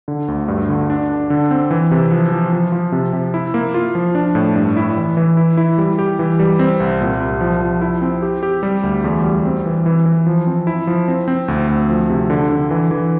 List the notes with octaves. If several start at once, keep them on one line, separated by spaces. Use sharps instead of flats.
D3
D2
G2
D3
D4
D4
D3
C4
E3
C3
F3
F3
F3
F3
C3
C3
E4
A#3
F4
F3
D4
A2
G2
E4
E3
E3
E4
E4
G3
G4
E3
G3
C4
C2
A#2
C2
F3
F3
E4
C4
G4
G4
G3
D2
E2
G3
C4
E3
E3
E3
F3
C4
E4
F3
C4
C4
D2
D2
F3
C3
D3
D3
E3
E3